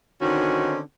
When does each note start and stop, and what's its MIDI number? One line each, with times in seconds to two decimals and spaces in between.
0.22 0.80 50
0.22 0.80 51
0.22 0.80 60
0.22 0.80 61
0.22 0.80 63
0.22 0.80 66